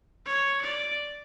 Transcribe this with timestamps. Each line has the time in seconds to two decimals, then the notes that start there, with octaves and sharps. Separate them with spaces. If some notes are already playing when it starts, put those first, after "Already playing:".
0.26 C#5
0.62 D5